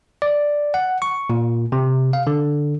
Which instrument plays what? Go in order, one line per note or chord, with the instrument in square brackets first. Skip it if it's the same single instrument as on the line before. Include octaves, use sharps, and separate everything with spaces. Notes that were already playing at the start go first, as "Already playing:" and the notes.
[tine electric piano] D5
F#5
C#6
A#2
C3
F5
D3